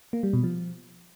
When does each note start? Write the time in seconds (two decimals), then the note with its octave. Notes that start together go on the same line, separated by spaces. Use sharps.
0.13 A#3
0.23 G3
0.33 B2
0.43 F3